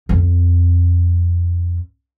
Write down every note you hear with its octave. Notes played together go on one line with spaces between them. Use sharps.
F2 C4